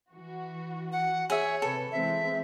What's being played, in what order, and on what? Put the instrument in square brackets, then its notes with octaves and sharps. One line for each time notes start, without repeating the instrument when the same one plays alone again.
[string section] E3 F#4
[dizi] F#5
[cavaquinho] G#4 E5 [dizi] C#5
[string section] C3 B4 [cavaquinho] A4
[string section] E3 G#3 C4 [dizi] E5